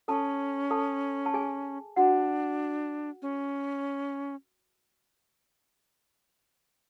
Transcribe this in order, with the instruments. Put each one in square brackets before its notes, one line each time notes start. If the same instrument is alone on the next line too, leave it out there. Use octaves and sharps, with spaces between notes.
[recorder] C#4 [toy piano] A4 A5
[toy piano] A4 A5
A5
G#4 G#5
[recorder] D4 [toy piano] F#4 F#5
[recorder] C#4